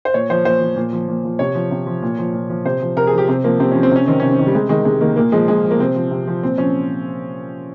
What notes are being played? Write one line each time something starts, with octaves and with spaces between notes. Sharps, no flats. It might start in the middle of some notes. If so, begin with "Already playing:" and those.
C5
A#2 C#5
F3 C5
A#2 C5
F3
A#2
F3
A#2
F3
C3 C#5
F3
C3
F3
A#2
F3
A#2
F3
C3 C5
F3
C3 A#4
G#4
F3
G4
C3 C4
F3 A#3
C3 C4
F3 C#4
C4
C3 C#4
D#3 C4
C3 C#4
C4
D#3
G3
C3 G#3
D#3 G#3
C3 G#3
D#3 A#3
A#2 A#3
F3 G#3
A#2 G#3
F3
A#3
C3 C4
F3
C3
F3
A#2 C4
F3 C#4